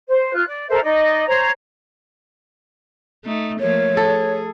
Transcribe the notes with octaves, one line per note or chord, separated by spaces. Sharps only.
C5
F4 F#6
D5
A4 A#4 C5 E5
D#4 D5 D#5
C5 C#5 A#5
A3 D#4
F3 A3 A#3 C#5
G#4 A4